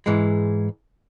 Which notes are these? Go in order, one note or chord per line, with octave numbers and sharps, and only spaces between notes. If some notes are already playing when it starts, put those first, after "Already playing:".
G#2 E3 G#3